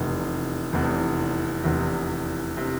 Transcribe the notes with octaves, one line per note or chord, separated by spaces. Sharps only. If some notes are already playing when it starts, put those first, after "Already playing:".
Already playing: F1 E2 C3
F1 E2 C3
F1 E2 C3
C3